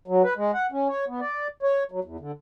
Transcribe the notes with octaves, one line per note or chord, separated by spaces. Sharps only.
F#3
B4
G#3
F#5
C#4
C#5
B3
D5
C#5
F#3
E2
D3